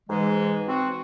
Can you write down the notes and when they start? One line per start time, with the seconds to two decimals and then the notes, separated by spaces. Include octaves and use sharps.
0.09 G#2 E3 G#3
0.68 C4 F#4